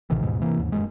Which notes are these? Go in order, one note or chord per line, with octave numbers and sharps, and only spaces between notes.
A1 C3 D#3 E3
D#2 G#2 B2 G#3
C3 E3 A#3
D#2 G#2
D#1 F#2 G#3